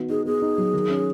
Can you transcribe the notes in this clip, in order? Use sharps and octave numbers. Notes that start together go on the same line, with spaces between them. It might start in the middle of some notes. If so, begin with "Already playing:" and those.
Already playing: D#3 B3 F#4
D#4 G#4
B3 G#4
D#4
F#3
D#3
C#4